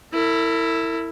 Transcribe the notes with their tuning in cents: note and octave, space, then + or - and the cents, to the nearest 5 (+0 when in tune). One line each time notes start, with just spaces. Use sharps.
E4 +0 A#4 -45